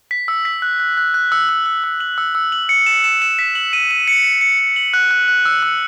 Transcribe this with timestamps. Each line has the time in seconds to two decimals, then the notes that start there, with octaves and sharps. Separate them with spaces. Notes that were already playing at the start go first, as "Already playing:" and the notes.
0.11 B6
0.28 E6
0.45 B6
0.62 F#6
0.80 F#6
0.97 F#6
1.14 F#6
1.32 E6
1.49 E6
1.66 E6
1.84 E6
2.00 F#7
2.18 E6
2.35 E6
2.52 F#7
2.69 C#7
2.86 E7
3.04 E7
3.22 E7
3.39 B6
3.55 F#7
3.73 D#7
3.91 D#7
4.08 C#7
4.24 E7
4.41 C#7
4.59 C#7
4.76 F#7
4.94 F#6
5.11 F#6
5.28 F#6
5.45 E6
5.63 E6